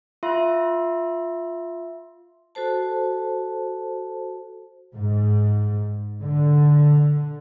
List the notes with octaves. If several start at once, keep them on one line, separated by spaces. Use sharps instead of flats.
F4 E5 C6
F#4 A4 C5 A5
G#2
D3